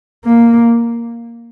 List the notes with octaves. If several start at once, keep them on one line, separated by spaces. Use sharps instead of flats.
A#3